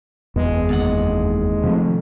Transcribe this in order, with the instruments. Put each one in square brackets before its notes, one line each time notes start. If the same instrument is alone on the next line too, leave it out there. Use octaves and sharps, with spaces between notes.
[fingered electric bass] F#1 E2 B3 [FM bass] G#3
[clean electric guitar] D#2 F#5
[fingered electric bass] C3 F3 A3